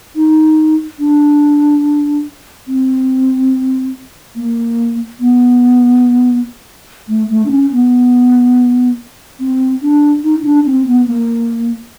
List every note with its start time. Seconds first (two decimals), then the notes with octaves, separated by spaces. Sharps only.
0.16 D#4
0.99 D4
2.68 C4
4.36 A#3
5.20 B3
7.08 A3
7.30 A3
7.45 D4
7.51 C#4
7.72 B3
9.40 C4
9.82 D4
10.24 D#4
10.39 D#4
10.45 D4
10.66 C4
10.87 B3
11.08 A#3